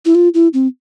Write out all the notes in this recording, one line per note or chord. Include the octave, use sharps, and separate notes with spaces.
E4
F4
E4
C4